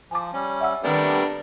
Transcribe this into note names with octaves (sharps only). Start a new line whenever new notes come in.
F3 G#5 A5 D6
G3 C#4
E5 F#5 E6
D#3 G3 A3 B3 C4 D4 G4 A#4